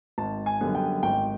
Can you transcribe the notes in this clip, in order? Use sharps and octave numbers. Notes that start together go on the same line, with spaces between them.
G#1 A5
G#5
F#2 D3 G3 B3
G5
G#1 G5